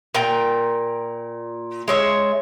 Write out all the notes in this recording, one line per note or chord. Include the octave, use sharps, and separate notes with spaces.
A#2 A#4 G5
G#3 C#5 E5